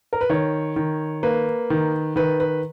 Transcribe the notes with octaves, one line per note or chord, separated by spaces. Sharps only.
A#4
B4
D#3 C#5
D#3
A#3 B4
D#3
D#3 B4
B4